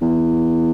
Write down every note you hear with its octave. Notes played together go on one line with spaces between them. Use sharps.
E2